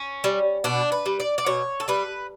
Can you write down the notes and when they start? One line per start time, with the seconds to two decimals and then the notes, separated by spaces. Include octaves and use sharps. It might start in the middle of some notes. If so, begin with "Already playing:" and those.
Already playing: C#4
0.24 G3
0.64 B2 D4
0.92 B4
1.06 G3
1.20 D5
1.38 D5
1.46 B2 C#5
1.80 A4
1.88 G3 B4